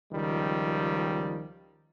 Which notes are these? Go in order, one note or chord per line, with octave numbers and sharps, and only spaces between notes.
C#2 D#3 F3 G3